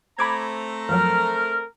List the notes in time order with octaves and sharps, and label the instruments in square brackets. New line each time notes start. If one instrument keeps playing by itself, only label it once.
[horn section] A3 C4 A#5 [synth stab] B5 D6 G#6
[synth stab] F2 F3 F#3 [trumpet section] A#4 [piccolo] F6